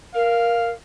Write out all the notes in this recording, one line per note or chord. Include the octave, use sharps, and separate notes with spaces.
A#4 F5